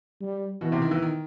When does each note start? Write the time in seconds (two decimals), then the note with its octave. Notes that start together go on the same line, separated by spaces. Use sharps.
0.21 G3
0.61 B2 E3
0.72 C3
0.82 D#3
0.91 E3
1.02 D#3